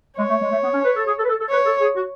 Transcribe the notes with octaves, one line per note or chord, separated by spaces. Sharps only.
G#3 C#5
A3
G#3
A3
B3
C#4
B4
A4
G#4
A4
B4
A4
A4
B4 C#5
A4
G#4
F#4